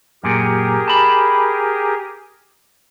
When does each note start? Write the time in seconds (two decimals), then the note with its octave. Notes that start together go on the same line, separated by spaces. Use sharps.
0.24 F#2 A#2 G4 G#4 A#4
0.88 A5 B5